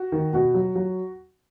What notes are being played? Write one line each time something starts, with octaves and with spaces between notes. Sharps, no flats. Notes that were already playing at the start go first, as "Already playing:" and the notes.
Already playing: F#4
D#3
B2 F#4
F#3
F#3